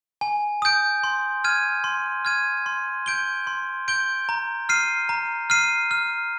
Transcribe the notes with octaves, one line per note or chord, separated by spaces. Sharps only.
G#5
D#6 G6 D7
C6
F6 G#6 D#7
C6
F6 G#6 D#7
C6
G6 D7 G7
C6
G6 D7 G7
A#5
F6 C7 D#7
A#5
F6 C7 D#7
F6